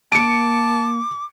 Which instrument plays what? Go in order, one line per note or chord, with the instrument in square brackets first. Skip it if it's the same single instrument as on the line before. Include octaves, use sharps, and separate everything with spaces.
[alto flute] A#3 [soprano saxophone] A5 [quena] D6 [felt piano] C#7 D7